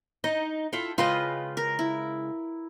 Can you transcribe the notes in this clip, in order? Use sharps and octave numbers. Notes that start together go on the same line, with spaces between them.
D#4 D#5
E4 F4 A4 G5
C#3 G#3 F4 B4 D#5 G5
A#4
E4